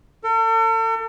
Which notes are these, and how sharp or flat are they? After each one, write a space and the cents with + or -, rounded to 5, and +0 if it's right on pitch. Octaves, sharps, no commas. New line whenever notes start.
A4 +40